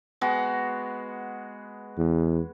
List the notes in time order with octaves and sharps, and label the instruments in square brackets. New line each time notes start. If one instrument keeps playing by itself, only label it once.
[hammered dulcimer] G#3 B3 F#4
[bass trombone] E2